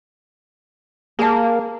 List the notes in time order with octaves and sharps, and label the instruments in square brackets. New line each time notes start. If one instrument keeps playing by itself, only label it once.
[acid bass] A#3 [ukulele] G#4 A5